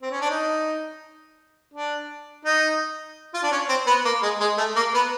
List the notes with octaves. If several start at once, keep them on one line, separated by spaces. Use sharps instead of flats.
C4
C#4
D4
D#4
D4
D#4
F4
D4
C#4
C4
B3
A#3
G#3
G#3
A3
A#3
B3